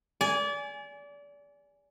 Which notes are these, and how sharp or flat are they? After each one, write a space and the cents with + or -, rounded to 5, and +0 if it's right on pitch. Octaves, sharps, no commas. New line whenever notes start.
D5 -30 G#5 +0